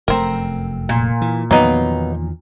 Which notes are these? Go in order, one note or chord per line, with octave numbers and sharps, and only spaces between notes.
F1 F#2 A3 C4 A#4
A#2
E3
E2 D#3 F3 F#3 A#3 B3 D#4